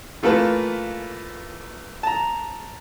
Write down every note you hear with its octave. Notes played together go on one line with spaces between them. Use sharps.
E3 A3 A#3 F4 B4 A5
A5 A#5